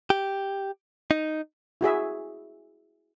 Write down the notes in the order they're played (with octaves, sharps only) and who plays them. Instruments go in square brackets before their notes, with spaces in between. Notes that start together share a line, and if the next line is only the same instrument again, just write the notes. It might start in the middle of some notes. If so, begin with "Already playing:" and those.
[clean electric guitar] G4
D#4
[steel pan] E4 F#4 G#4 E5